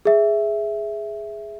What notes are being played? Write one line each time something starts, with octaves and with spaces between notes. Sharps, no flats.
G#4 E5